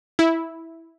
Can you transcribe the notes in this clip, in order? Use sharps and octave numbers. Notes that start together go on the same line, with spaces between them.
E4